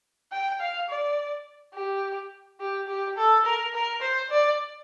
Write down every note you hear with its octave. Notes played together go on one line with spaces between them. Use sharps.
G5
F5
D5
G4
G4
G4
A4
A#4
A#4
C5
D5